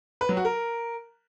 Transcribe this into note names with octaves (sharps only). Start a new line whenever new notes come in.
B4
F#3
F#4
A#4